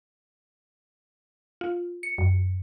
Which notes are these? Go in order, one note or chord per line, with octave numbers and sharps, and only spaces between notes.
F4
C#7
F#2